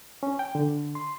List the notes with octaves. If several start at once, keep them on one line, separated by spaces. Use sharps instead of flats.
C#4
G5
D3
C6